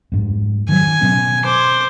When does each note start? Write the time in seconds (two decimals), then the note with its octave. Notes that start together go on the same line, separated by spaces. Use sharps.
0.12 F2 G#2
0.69 D#3 F#3 G#5
1.01 B2 C4 C#4
1.44 C5 D6